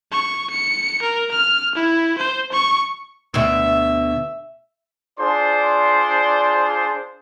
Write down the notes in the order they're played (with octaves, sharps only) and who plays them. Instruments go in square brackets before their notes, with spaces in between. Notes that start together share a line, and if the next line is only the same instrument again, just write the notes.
[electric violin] C#6
C#7
A#4
F6
E4
C5
C#6
[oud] D2 B2 [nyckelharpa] E5
[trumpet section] D4 F4 G#4 C5 D5 C6